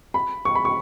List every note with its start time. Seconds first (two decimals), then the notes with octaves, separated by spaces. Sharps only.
0.14 B5
0.45 C#6
0.55 B5
0.65 C#6